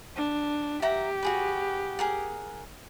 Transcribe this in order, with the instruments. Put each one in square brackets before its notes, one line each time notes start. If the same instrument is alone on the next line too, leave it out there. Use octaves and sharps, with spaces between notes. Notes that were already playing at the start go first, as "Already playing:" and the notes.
[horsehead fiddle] D4
[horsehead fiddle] G4 [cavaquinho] E5 F#5 A#5
[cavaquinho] F#4 G#4 B4
G#4 A#4 F#5